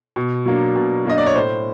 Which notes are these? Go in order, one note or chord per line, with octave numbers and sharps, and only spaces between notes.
B2
F#3 A#3 D4
B2
F#3 A#3 D4 D#5
D5
C#5
A2 C5